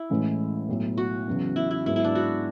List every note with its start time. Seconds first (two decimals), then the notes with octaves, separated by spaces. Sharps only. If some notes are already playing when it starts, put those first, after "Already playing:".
Already playing: E4
0.10 A1 A2 G#3 C#4
0.68 B1 A2 F#3
0.98 F#4
1.27 E2 C#3 F#3
1.56 E4
1.71 E4
1.85 G#2 F#3 B3 E4
1.96 E4
2.05 D4
2.15 F#4